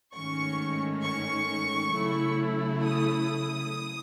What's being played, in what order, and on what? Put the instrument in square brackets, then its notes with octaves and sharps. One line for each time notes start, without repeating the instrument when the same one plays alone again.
[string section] G#2 D#3 A3 C#4 C#6
C#6
C#3 F#3 A3 E4
D#6